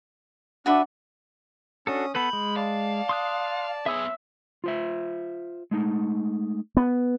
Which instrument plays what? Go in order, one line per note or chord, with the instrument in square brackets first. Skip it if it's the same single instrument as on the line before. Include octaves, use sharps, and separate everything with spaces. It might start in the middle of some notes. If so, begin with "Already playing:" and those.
[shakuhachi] D4 [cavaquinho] F#4 B4 E5
[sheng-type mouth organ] C#4 D#6 [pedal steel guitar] D4 F#4 A4
[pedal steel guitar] B3 A4 B4 [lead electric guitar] B5 [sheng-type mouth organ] G6
[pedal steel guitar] G#3
[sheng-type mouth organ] D5 A5 [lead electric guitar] F5
[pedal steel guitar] C6 D#6 F#6
[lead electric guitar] B3 C#5 [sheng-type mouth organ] G#4 [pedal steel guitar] E5 E6
[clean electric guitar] F4 C5 E5
G#3 A3 D#4
[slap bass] B3